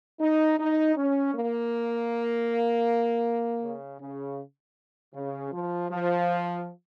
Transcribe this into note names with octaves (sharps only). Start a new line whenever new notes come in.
D#4
D#4
C#4
A#3
C#3
C#3
C#3
F3
F3